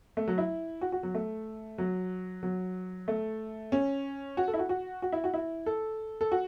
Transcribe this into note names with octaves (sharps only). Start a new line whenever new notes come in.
A3
F#3
E4
F#4
F#4
F#3
A3
F#3
F#3
A3
C#4
F#4
A4
E4
F#4
F#4
F#4
E4
F#4
E4
A4
A4
F#4